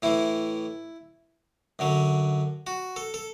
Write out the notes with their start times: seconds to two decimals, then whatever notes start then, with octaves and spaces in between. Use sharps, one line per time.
0.02 A2 E3 E4
1.79 F#2 D3 F#3
2.67 F#4
2.96 A4
3.14 A4